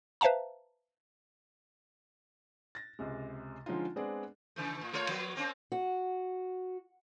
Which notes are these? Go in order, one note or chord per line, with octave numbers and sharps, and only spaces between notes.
B4 C5 E5 F5 A5 A#5
A6 A#6
C#2 C3 G#3
D3 F3 G#3 C#4 D#4 F4
G#3 B3 C4 D4 G#4 D5
C#3 E3 A3
A2
G#3 F4 C#5
F3 A#3 B3
A#3 C4 C#4
F#4